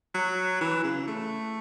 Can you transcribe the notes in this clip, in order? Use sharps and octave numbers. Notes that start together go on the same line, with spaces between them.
F#3
E3
C#3
A3